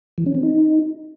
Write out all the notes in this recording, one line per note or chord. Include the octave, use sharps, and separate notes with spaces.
E3
C#4
C4
D#4